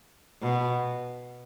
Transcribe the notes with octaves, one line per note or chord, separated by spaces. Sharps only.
B2